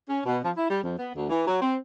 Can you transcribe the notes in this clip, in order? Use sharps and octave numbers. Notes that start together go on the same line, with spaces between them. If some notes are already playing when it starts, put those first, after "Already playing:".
C#4
B2
F3
E4
G3
F2
B3
D2
E3
F#3
C4